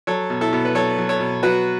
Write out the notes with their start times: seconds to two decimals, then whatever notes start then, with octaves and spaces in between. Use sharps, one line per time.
0.07 F#3 A4 C#5
0.30 B2
0.41 E4 A4
0.53 B2
0.65 B4
0.75 F#3 A4 C#5
0.98 F#3
1.09 A4 C#5
1.20 B2
1.43 F#3 F#4 B4